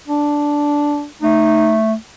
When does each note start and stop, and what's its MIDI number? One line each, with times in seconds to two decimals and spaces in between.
0.07 1.05 62
1.22 1.94 57
1.22 1.78 63